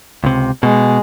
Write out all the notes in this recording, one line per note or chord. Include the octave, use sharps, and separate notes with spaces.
C#2 C3
B2 G#3